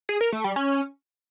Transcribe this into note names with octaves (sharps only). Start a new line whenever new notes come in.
G#4
A#4
A3
G3
C#4